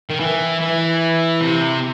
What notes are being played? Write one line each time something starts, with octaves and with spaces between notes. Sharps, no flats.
D#3
E3
E3
C3